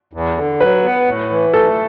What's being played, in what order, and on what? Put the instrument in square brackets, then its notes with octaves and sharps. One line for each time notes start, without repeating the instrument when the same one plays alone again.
[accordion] E2
D3
[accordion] F#3 [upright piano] B4
[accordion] B3
A2
E3
[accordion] A3 [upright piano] A4